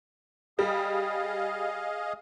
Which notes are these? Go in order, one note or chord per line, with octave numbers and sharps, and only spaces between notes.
G3 G#4 D#5 F5